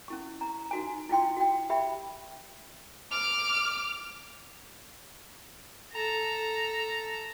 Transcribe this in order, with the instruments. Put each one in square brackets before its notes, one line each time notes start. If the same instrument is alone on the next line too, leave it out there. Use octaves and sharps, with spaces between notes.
[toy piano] C#4 E4 C#6
A#5
D#4 F#4 G#5
E4 F4 G5 C6
F#4 G5
G4 E5 G5 B5
[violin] D6 F6
[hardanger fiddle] A4 A#5